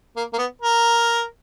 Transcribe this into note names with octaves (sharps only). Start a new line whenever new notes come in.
A#3
A#3
B3
A#4